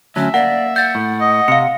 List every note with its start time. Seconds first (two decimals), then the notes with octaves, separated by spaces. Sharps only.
0.16 D2 F#3 C#4 E5
0.34 A#3 D5 F#5
0.76 F#5 G6 A6
0.95 A2
1.21 D#5
1.48 C3 F5 C#7